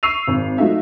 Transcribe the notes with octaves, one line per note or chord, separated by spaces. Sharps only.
C#6 E6 C7 D#7 F7
G#1
F#3 A3 D#4 F4 E5